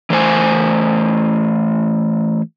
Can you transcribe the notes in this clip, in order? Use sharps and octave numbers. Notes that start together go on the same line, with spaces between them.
E3 A3 C5 G#5